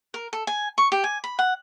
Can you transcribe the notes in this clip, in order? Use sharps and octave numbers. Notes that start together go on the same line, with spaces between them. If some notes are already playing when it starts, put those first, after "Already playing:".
A#4
A4
G#5
C#6
G4
G#5
B5
F#5